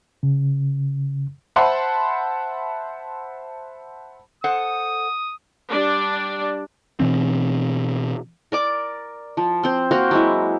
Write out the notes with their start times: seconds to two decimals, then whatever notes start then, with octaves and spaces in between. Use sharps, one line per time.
0.23 C#3
1.56 C5 E5 F#5 A5 B5 C6
4.44 A4 C5 F#5 D#6
5.69 G3 D4 D5
7.00 B2 E3 C4
8.52 A#4 D5 D6
9.37 F3
9.63 C4 C5
9.91 A#3 F#4 C5 F5
10.11 F#3 G#3 E4